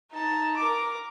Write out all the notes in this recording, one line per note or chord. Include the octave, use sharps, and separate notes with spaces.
D#4 A5
A#4 D6